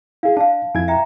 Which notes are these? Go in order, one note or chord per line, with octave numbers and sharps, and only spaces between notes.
E4 G#4 F5
D4 F5 A5
F2 E4 G#5 G#6
E5 G5 A#5